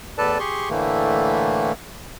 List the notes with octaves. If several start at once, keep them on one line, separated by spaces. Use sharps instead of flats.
E2 A2 A4 B4 D5 A5
G4 G#4 C6 C#6
A2 D3 E3 A3 A#3